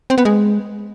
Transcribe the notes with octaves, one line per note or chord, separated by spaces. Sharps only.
C4
B3
G#3